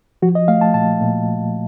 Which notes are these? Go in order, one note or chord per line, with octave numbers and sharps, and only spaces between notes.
F3 F#4
D#5
A3 F5
A5
A#2 A5
A#2